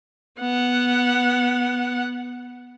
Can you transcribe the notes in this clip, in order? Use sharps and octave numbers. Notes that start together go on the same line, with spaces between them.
B3 F#5